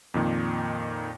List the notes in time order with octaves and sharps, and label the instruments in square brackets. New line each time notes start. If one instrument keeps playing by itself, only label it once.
[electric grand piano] F2 A#2 D#3